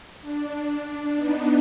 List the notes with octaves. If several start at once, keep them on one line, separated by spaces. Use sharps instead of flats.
D4
B3 D#4